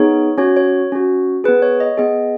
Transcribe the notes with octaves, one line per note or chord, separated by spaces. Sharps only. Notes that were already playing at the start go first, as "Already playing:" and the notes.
Already playing: B3 D#4 G#4 C#5
C#4 F#4 C#5
C#5
C#4 F#4
B3 G#4 B4
C#5
D#5
B3 G#4 D#5